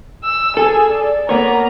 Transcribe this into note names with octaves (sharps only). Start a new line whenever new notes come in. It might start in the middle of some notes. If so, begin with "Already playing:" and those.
E6
G#4 A4
D5
A#3 B3 C#5 A#5